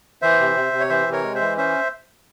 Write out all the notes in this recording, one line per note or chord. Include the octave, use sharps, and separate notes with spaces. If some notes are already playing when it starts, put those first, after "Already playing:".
E3 C5 E5
C3
C3
C3
C#5
E3 C5 E5
C3
A#4 C#5
G#3
C5 E5
E3
C#4 C5 E5